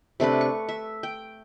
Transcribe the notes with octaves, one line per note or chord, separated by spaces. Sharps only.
C3 A3 D4 B4
C#6
E5
G5